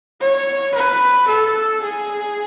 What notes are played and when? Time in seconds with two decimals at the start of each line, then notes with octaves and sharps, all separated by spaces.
0.21 C#5
0.75 B4
1.28 A4
1.82 G#4